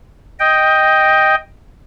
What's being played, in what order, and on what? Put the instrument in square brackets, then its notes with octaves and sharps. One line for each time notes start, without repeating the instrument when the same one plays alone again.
[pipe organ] D#5 G5